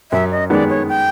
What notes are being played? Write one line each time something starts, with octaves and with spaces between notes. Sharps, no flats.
F#2 E5
D#5
D#3 G#3 B3 D5
C#5
G5